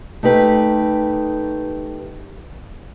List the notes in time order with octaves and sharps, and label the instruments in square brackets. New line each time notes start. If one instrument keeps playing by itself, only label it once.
[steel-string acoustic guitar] A3 D#4 G4 B4